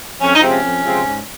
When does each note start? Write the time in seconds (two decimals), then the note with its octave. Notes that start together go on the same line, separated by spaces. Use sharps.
0.20 F2 C#4
0.34 D#4
0.41 C3 F3 G#3 C4
0.48 C#4
0.63 F2
0.83 C3 F3 G#3 C4
1.04 G#2